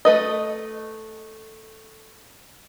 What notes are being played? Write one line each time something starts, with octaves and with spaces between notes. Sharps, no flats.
A3 B4 D#5